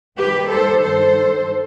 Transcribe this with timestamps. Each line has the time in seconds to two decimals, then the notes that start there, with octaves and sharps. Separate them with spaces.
0.18 D#2 D#3 G3 G4 B4
0.50 A4 C5
0.83 G2 D#3 G3 A4 C5